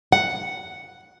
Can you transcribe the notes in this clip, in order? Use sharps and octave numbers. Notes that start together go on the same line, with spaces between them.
F#5